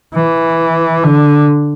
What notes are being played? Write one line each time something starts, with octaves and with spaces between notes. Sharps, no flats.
E3
D3